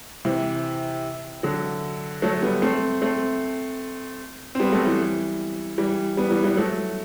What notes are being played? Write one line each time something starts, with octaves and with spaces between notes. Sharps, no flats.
C3 E3
D3 F#3
F#3 A3
G3 B3
A3 C4
A3 C4
C4
G3 B3
F#3 A3
E3 G3
E3 G3
G3 B3
E3 G3
E3 G3
F#3 A3